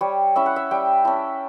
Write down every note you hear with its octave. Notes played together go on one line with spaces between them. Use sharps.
G3 C#5
C#4 E4 E5
F#5
E5
G3 G5
C#4 E4 A5